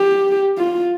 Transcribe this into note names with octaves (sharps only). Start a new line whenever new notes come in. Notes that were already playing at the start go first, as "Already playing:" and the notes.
Already playing: G4
F4